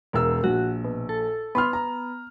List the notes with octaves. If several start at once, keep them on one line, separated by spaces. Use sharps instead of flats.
E1 A#4 E6
A#1 F#4
B2
A4
B3 B5 C6 F6
A#5